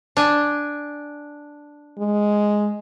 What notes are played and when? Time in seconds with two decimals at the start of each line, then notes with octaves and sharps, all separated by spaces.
0.17 D4 G#5
1.99 G#3